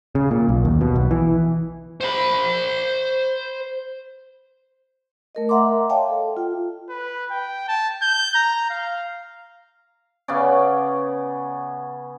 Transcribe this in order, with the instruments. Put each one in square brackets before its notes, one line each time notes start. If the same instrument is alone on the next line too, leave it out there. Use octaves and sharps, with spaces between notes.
[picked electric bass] C#3
A#2
B1
D#2
B2
B1
E3
[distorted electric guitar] C5 B5
[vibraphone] A3 A#4 D#5
E5 F#5 A#5 C6 D6
C#5 D#5 F5 G5 A5
A4
F4 G5
[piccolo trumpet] B4
G5
A5
G6
A#5
F5
[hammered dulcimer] C#3 B3 C#4 D5